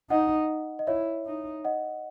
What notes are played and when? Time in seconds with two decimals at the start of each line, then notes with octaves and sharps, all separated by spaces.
0.10 D#4 D#5 F#5
0.79 D#5
0.87 E4 C#5 E5
1.26 D#4
1.64 D#5 F#5